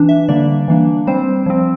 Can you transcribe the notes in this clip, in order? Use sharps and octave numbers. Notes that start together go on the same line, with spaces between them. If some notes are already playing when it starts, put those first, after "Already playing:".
Already playing: E3 D4
E5
D3 G3 A#3 D4 D5
E3 A#3 D4
G3 C4 C5
F3 C4